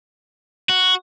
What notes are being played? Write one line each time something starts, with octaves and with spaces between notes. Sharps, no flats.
F#4